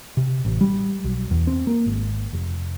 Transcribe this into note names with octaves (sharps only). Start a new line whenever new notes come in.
C3
A1
G3
B1
E2
C4
A#3
G#1
F1